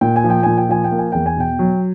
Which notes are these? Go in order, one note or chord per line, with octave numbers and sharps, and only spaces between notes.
A#2 G5
G#5
F3
G5
A#2 G#5
G5
F3 G#5
G5
A#3
G#5
E2 G5
G#5
B2 G5
F#3